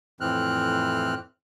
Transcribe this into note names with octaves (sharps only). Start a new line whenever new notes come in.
F2 A2 E3 C4 F6 F#6